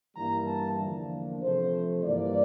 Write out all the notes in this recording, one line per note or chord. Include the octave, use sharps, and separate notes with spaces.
G2 E3 G3 A#3 E4 A#5
A5
E2 D3 F3 A#3 D4
C3 F3 A3 C5
G2 E3 A#3 D4 D5